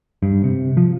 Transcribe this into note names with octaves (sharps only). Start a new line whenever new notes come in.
G2
C3
F3